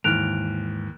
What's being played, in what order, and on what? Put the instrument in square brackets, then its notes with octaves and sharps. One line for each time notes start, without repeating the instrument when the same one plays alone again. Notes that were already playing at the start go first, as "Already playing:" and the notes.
[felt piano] D#2 E3 F6 [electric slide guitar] G#2 [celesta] F#6 D7 F7